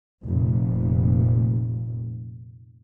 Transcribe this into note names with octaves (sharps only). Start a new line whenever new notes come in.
F1 A#2